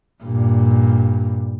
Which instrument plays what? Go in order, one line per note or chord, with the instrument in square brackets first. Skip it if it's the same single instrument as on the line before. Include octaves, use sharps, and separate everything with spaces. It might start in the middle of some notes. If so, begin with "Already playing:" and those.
[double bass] G2 A#2